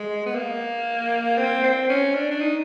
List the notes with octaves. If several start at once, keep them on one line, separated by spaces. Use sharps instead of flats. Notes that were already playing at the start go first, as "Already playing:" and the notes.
Already playing: G#3
B3
A#3
C4
C4
C#4
D4
D4
D#4